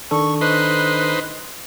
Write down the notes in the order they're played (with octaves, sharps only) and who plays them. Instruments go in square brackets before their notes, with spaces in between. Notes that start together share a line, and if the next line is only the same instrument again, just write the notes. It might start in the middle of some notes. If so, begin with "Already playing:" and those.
[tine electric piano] D#3 D4 A4 [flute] C#6
[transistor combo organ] D#4 B4 C5 [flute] F#6